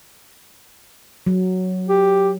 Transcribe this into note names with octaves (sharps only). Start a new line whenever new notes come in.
F#3
G4